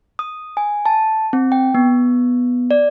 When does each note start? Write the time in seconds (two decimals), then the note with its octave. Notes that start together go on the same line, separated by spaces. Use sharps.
0.19 D#6
0.57 G#5
0.86 A5
1.33 C4
1.52 G5
1.74 B3
2.71 D5